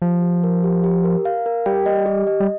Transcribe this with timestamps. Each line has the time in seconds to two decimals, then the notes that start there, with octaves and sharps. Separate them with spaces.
0.02 F3 G4
0.22 G4
0.44 A#4
0.64 G4
0.84 G4
1.04 A#4
1.25 F5
1.46 A#4
1.66 G3 G5
1.86 D#5
2.06 G4
2.27 D#5
2.40 G3